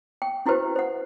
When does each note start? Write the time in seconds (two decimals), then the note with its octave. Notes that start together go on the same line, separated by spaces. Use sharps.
0.22 G5
0.46 C#4 E4 F#4 G4 B4 C5
0.76 C5 F#5